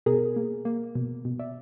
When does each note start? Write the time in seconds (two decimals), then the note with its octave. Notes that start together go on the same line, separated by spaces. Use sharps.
0.06 B2 G#4 A#4
0.36 A#3
0.65 A#3
0.95 B2
1.25 B2
1.39 D5 E5